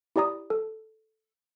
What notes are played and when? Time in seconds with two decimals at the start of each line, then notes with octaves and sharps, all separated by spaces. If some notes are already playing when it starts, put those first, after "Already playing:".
0.16 E4 G4 D5 A#5 D#6
0.50 A4